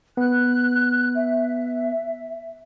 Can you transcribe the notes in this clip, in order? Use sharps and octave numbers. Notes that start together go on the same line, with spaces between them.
B3 F#6
E5